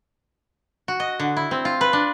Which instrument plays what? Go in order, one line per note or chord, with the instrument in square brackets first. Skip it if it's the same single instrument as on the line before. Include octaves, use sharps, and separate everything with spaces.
[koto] F#4
D#5
D3
E4
C4
F4
B4
D4